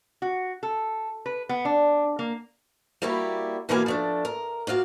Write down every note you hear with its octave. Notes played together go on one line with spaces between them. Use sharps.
F#4
A4
B4
B3
D4
A#3
G3 A#3 E4 F#4 G4
B2 E3 G3 A#3 F5 G#5
F3 A3 D4
A#4
A#3 F4 F#4 F5